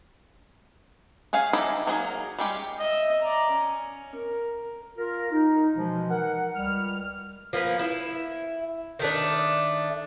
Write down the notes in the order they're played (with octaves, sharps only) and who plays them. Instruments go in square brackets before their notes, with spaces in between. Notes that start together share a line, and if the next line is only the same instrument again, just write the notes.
[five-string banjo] C#4 G#4 F5 G#5
D#4 E4 G4 A4 D#5
F#3 A#3 D#4 F#4 G#4
G3 G#3 C#4 G4
[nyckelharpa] D#5 E5
D5 A#5
C#4
A#4
[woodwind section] F4 A#4
D#4
B2 E3 F3 G#3
A#4 F#5
C#2 G3 F6
[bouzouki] F3 A#3 B3
E4
D#3 A3 D4